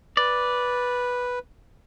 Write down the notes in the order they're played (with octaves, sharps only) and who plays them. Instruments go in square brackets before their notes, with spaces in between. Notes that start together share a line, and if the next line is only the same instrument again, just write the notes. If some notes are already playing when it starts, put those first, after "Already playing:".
[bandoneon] B4 [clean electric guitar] D5